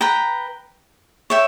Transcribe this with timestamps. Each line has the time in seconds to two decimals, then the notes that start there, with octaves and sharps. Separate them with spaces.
0.01 B4 G5 A#5
1.30 C#5 E5 G5